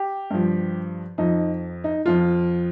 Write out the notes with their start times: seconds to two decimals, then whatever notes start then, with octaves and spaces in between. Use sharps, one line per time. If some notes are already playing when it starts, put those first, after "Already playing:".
Already playing: G4
0.31 G2 F3
1.18 F2 F3 D#4
1.84 D#4
2.05 F2 F3 F4